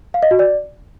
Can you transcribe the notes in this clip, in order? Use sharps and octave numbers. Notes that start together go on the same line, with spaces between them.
F5
D#5
F#4
D5